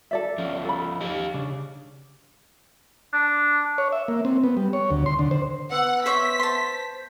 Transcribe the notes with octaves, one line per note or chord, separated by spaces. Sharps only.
A4 D5 E5
F3 C#4
A4 B5
D#4 G4 D#5
C#3 D4
D4
C#5
E5
A#3
C4
B3
G3
C#5
D2
C6
D3
C5
B3 F#5 E6
C5 C#5 E5 C#6 B6
C5 A5 C6